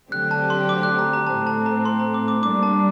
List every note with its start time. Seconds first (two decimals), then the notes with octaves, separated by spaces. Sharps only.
0.11 D3 F#3 A3 C4 G4 F#6
0.31 A5
0.50 C6
0.69 D6
0.83 F#6
0.99 A#5
1.13 A#5
1.27 A2 A3 C4 A5
1.47 A5
1.66 A#5
1.85 C6
2.00 A#5
2.14 D6
2.28 D6
2.43 G3 A#3 D4 D6
2.63 A5